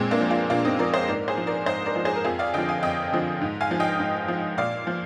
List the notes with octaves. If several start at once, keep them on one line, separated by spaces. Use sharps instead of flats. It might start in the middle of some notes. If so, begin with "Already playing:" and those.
Already playing: A#2 G#3 C4
A#3 D4
F3
D4 F4
A#2 D4 F4
C4 D#4
F3 A#4 D5
C5 D#5
G#2 A#4 D5
G#4 C5
F3
A#4 D5
G#2 C5 D#5
A#4 D5
F3
G#4 C5
A#4
F2 F4 G#4
D5 F5
D3 F3 D#5 G5
F5 G#5
F2 D#5 G5
D3 F3
G#2
F5 G#5
F3
D#5 G5
G#2
F3
A#2 D5 F5
F3